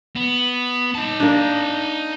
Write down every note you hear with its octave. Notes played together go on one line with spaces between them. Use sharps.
B3
D#4 A5
A#3 D4